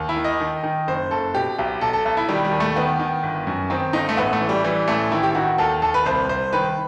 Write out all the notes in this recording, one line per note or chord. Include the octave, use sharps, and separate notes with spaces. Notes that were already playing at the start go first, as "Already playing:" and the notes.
Already playing: D#2
E4
D#3
D#5
D#3
D#3
F#1 C5
F#1 A4
B2 G4
B1 G4
B1 A4
A4
B1 A4
E4
D#3 G3
G3
D#2
A3
D#3 B3
D#3
G1
F#2
D#3 C4
G1 D#4
A3
A1 B3
A3
E3
G3
E3 G3
A1 A3
D#3 E4
G4
D#3 F#4
D#2 A4
D#2 A4
B4
C2 C5
C2 C5
D#3 B4